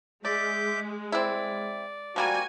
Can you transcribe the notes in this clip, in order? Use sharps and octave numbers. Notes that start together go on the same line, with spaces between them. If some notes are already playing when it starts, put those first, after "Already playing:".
G#3 D5 E5 D6 G6
C4 E4 D5
F3 G3 A#3 F#4 G#5